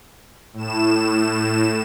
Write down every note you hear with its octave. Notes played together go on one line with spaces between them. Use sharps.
A2 E7